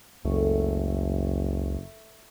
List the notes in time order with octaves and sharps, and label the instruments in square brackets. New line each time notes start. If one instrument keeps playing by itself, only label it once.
[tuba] F#1 [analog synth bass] C#2 [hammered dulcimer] A3